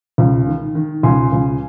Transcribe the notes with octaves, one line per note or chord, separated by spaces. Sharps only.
C#2
D#3
D#3
C#2 G#5 C6
C#2